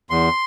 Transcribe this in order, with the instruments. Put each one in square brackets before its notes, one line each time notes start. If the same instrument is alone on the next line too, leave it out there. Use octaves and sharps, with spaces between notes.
[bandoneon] E2 [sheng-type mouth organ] C6